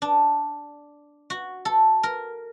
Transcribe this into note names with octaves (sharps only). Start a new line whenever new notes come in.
D4
F#4
A4
A#4